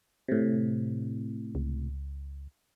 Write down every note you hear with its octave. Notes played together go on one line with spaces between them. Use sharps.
A2 C3
C#2